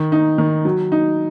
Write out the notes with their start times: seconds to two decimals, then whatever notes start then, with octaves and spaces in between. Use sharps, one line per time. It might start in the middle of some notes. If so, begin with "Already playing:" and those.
Already playing: D#3
0.12 D#4
0.38 D#3
0.65 F#3
0.92 D#4